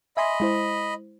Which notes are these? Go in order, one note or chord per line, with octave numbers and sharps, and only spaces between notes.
D#5 E5 G#5 B5 C6
G#3 E4 C5